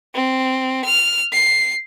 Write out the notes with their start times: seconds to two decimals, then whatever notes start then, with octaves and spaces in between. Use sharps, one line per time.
0.14 C4
0.85 F6
1.32 C7